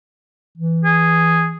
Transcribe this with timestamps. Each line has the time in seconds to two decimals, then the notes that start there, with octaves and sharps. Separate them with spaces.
0.58 E3
0.85 G#4